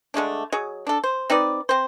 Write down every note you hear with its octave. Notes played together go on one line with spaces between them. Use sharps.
D3 G#3 A3 D4
F#3 G#4 C#5 D#5
D4 A4
C5
C4 D#4 B4 D5
C4 C5